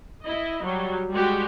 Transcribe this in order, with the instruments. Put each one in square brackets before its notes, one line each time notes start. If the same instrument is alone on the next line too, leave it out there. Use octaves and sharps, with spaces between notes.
[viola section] E4 D#5
F#3 G3
G3 G#3 F#4 G4